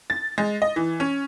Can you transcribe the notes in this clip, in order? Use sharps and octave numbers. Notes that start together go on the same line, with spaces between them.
A6
G#3
D#5
E3
C#4